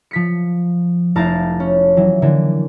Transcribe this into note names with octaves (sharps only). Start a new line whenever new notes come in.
F3 B6 C#7
F1 A3 E4 F5 A5 A#5
C#4
E3 F#3
D3 E3 A#3